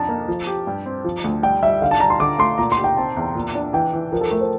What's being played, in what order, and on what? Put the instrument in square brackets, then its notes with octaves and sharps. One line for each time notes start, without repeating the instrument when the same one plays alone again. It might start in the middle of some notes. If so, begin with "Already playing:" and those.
Already playing: [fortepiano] F2 D4 [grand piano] A5 A#5
[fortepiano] A#3
F3
G4
G2
C4
F3
D2
[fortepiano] G3 [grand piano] G5
[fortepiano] G3 [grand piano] E5
[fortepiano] D3 [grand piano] F5
[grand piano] A5
[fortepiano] G3 [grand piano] A#5
[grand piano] C6
[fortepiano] D3 [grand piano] D6
[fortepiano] A3 [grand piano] C6
[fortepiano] A#2 [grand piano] A#5
[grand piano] C6
[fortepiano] G4
[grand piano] G5
[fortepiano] C4 [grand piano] A5
[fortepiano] E2
A#2
D4
[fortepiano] E3 [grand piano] G5
[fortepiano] E3
[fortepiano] F3 [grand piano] A#4
[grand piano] A4
[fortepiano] A3 [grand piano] A#4
[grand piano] C5